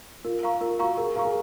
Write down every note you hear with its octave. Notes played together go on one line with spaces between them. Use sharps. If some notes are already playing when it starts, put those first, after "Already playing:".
F4 A#4
F5 A#5 C#6
F4 A#4
F#4 F5 A#5 C#6
G#4 A#4
A#4 F5 A#5 C#6
G#4